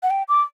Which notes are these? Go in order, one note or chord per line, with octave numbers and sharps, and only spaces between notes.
F#5
G5
D6